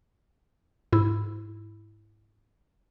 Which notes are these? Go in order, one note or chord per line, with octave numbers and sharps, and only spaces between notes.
G#2 E4